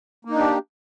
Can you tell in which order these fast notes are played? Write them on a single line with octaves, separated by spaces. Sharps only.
A#3 D#4 D4 G4